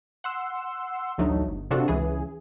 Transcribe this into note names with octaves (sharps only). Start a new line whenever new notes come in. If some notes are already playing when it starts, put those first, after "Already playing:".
F#5 C6 E6
A1 D2 F#3 A3 D#4
G1
C3 D4 F4 F#4 A4
C#2 E3 G#4